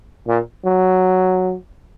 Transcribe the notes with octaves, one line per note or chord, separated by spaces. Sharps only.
A#2
F#3